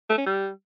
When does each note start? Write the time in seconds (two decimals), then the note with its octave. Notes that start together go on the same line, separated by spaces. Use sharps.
0.10 A3
0.18 C#4
0.27 G3